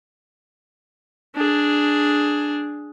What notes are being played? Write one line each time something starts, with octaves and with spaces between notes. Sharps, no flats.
D4 G#4